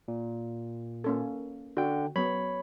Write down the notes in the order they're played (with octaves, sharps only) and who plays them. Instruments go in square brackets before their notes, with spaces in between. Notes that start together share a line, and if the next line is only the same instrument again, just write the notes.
[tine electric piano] A#2
[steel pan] A#3 C#4 A4
[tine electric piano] D3 G5 [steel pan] F#4
[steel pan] F#3 B3 [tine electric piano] C#5 B5